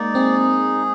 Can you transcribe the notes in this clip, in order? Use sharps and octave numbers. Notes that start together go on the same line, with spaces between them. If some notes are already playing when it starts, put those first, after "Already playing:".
Already playing: G#3 A#3 D#4 D5
C4 G#4